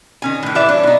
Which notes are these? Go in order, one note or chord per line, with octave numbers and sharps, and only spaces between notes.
D#3 C#4 G#5
A2 E3
E3 B4 D5 E5
F#3 D4
B2 D#4